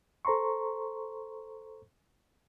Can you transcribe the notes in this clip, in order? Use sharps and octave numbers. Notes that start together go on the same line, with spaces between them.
A4 C5 A#5 C6 C#6